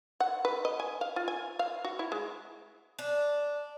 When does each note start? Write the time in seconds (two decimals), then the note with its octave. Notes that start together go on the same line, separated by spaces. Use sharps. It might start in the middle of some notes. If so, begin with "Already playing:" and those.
0.20 F#5
0.45 B4
0.65 D#5
0.80 G#5
1.01 F5
1.16 F4
1.28 G#5
1.59 F5
1.85 F#4
1.99 E4
2.12 G#3
2.99 D4